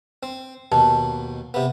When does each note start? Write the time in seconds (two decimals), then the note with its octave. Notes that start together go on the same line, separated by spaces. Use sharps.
0.23 C4
0.72 D#2 B2 A5
1.54 C3 B3